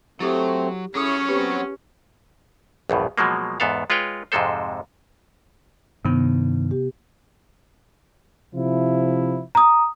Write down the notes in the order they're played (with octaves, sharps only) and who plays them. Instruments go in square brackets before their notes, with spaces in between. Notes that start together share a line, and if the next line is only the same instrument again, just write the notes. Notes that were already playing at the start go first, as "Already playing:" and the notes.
[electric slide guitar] F#3 [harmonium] A3 C4 [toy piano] E4 G4 A4
[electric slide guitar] F#3 C#5 [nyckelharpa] C#4 [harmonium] E4 [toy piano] G#4 A4 D#6
[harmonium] B3 C4 [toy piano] F4 G4 B4
[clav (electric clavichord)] A#1 E2 G2 B2
B2 F3 F#3 G#3 A#3
E2 G#2 B3 A4 F5
G#3 F4 B4 C#5 G5
F2 G#2 C3 G#3 A4 C5
[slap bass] G2 D#3 [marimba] C3 B3
[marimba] G4
[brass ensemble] C3 F3 E4
[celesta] A#5 D#6